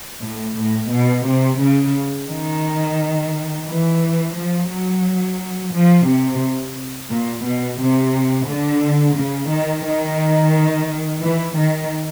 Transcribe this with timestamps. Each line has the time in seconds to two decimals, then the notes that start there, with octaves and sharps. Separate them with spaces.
0.22 A2
0.57 A2
0.92 B2
1.26 C3
1.60 C#3
2.29 D#3
3.66 E3
4.35 F3
4.69 F#3
5.73 F3
6.06 C3
7.10 A#2
7.44 B2
7.78 C3
8.48 D3
9.15 C#3
9.49 D#3
9.85 D#3
11.21 E3
11.56 D#3